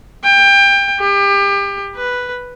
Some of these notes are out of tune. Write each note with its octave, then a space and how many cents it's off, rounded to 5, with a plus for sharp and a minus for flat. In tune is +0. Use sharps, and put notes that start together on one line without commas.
G5 +25
G4 +30
B4 +0